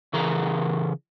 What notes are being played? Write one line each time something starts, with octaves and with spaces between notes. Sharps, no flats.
C#3 E3 G#4 A#4 A#5